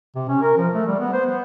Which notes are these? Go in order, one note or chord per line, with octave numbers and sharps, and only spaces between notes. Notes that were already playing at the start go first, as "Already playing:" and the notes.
C3
C#4
A#4
F3
A3
G3
B3
C5
B3